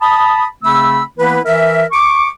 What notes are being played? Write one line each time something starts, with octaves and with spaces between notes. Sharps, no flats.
A5 B5 D#6
C#3 A3 C4 B5 E6
E3 A#3 B3 E4 B4
E3 A#4 E5
C#6 D6